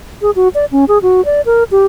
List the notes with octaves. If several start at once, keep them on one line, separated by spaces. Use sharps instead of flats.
G#4
F#4
D5
C#4
G#4
F#4
D5
A#4
G4